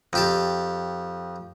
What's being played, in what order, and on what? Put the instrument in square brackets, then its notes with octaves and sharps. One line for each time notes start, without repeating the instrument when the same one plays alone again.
[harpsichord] F2 G4 A5